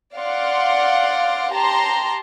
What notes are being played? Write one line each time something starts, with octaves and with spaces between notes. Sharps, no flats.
D5 F5 F#5 C6
G4 A5 A#5 C6